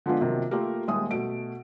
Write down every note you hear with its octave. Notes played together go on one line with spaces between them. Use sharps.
D3 F3 G#3 B3 D4 F4
C3 D#3 F3 F#3 A#3
A3 A#3 F4 G4 A#4
D#1 D#2 G#3 E5 D#6
B2 A3 D7